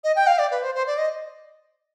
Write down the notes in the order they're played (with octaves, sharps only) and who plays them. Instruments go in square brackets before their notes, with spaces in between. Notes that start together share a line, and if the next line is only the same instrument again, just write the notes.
[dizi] D#5
G5
F5
D5
B4
C5
C5
D5
D#5